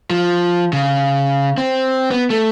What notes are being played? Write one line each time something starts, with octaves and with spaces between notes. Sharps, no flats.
F3
C#3
C4
B3
A3